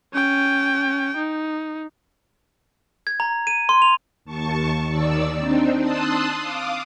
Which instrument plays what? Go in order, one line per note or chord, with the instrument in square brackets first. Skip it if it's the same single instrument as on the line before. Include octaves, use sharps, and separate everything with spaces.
[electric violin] C#4 G5
D#4
[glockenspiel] G#6
A#5
D#7
C6
F7
[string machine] D#2 A5 C#6
D#2 D#3 D5 E6
C4 D4 D#4
A5 C6 D#6 E6 F#6
F5 D6 D#6